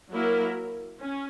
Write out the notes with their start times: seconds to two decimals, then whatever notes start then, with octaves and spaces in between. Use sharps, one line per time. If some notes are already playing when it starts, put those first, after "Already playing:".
0.11 F#3 A#3 E4 A#4
1.00 C#4